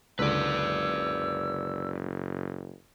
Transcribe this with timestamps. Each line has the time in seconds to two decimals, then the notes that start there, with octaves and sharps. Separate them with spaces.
0.19 F#1 C#2 D3 B4 D5 E6